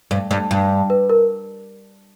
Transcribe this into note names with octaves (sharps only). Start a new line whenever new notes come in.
G2
G2
G2
B4
A#4